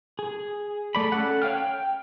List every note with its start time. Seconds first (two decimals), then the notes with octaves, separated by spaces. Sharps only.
0.19 G#4
0.95 A3 D5 B5
1.12 C#4 A4 F#5
1.42 C#5 F5 G5 F6
1.58 G5